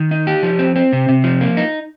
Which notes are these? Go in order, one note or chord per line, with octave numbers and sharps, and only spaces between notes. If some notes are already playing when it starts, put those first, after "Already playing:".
Already playing: D#3
D#4
G4
F3
C4
C4
C3
C3
F3
A#3
D#4